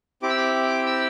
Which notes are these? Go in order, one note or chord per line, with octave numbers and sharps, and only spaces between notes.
C4 E4 G4 D6
E6
D6
E6